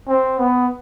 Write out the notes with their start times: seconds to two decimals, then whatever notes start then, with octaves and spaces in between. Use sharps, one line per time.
0.08 C4
0.39 B3